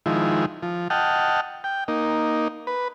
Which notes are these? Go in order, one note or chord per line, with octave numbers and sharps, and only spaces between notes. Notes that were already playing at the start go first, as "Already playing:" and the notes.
D#3 F3 G#3 E4
F3
D#5 F#5 G5 A5 F6
G5
A#3 D#4
B4